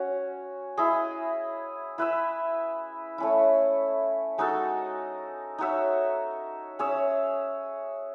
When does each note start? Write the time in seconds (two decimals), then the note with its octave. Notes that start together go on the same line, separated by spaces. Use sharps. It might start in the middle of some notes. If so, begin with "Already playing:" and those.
Already playing: C#4 F#4
0.77 E4 G#4 D#5
1.98 E4 B4 E5
3.18 A3 C#4 E4
4.38 G#3 D#4 F#4 A4
5.58 D#4 F#4 C#5 E5
6.79 C#4 G#4 C#5 E5